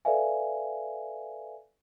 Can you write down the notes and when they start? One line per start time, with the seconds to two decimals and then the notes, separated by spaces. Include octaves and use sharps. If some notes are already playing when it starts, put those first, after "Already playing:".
0.05 A4 B4 D5 E5 F5 G#5